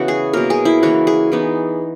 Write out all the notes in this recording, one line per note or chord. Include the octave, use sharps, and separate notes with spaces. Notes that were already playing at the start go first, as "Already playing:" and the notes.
Already playing: C#3 E3 B3 E4 F#4
G#4
B2 F#3 A#3 A#4
G#4
E4
C#3 E3 A#3 F#4
G#4
E3 B3 D#4